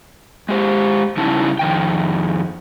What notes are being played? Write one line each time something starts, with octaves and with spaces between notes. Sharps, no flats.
G#3 G4 C5
C#3 G3 C#4 D#4 E4 A5
F2 D#3 G5